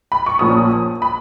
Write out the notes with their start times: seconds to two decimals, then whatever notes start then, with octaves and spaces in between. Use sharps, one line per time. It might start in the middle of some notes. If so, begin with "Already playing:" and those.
0.12 B5
0.26 C#6
0.39 A#1 A#2 F3 A#3 C#4 D#6
1.02 B5